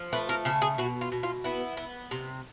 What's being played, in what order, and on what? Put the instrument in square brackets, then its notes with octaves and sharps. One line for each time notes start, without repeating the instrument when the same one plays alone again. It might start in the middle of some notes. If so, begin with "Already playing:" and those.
Already playing: [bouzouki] F3
A3 B4
A#4
C#3 A4
G#4
B2 F#4
F4
B2
F4
B3 E4
B3
C3